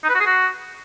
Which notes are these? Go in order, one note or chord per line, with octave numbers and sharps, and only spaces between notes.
D#4
B4
F#4
G#4
F#4